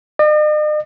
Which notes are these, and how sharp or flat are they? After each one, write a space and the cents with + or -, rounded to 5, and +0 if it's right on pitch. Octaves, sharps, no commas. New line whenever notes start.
D#5 -45